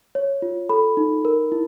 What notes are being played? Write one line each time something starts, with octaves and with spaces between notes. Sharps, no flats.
C#5
F4
A4 B5
D#4
A#4
E4